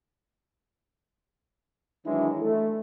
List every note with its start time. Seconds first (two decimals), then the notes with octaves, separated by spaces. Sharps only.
2.06 D#3 E3 F#3 G#3 D4 E4
2.42 A3